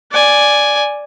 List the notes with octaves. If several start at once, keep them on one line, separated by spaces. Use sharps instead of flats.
D5 G#5